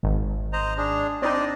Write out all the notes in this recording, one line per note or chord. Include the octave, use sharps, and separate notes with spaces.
G#1
C5 D#5 A#5
D4 G#4
C4 D4 D#4 D5 D#5